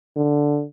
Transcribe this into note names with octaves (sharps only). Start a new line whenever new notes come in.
D3